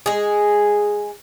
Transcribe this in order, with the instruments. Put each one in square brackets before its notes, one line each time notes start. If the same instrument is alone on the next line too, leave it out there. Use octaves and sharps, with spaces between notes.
[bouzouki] G#3 G#4